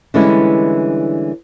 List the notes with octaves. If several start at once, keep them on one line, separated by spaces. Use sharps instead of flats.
D3 E3 G3 G#3 C#4 E4